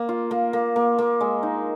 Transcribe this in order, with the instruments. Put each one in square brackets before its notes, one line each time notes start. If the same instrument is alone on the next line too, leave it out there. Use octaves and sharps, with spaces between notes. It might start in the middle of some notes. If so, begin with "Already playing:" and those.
Already playing: [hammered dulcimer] A#3
F4
A#3
A#3
A#3
A#3
G#3
D#4